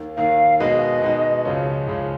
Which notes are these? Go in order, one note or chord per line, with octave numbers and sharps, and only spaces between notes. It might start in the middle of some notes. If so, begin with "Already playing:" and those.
Already playing: D#2 D#3 A#3
D#2 D#3 A#3 F5
B2 G#3 D#4 F#4 B4 D#5
B2 G#3 D#4 F#4 B4
C#2 C#3 F3 G#3 C#4
C#2 C#3 F3 G#3 C#4